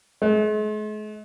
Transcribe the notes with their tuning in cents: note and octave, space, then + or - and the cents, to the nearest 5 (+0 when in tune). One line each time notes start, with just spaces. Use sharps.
G#3 +45